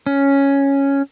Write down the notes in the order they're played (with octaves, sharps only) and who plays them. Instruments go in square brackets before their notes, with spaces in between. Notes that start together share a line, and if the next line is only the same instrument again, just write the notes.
[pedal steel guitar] C#4